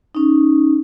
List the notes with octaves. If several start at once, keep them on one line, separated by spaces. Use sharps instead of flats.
C#4 D#4